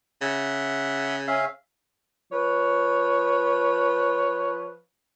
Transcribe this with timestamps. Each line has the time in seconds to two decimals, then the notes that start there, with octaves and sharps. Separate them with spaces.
0.21 C#3 E5 F#5
1.27 C#4 E5 F5
2.32 F3 B4 C#5